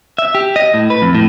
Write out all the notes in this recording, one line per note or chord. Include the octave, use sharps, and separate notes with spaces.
E5
G4
D#5
A2
B4
F2
A2